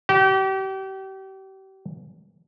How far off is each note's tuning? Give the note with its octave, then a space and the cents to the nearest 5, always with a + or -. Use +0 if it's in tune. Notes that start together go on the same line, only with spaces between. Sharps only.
G4 -35